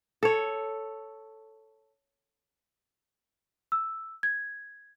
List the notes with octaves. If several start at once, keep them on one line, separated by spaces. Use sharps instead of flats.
A4 C#5
E6
G#6